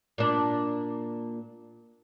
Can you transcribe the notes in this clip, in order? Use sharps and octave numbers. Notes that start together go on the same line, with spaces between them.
A#2 D4